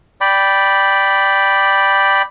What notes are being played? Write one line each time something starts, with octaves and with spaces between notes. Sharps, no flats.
D5 G5 B5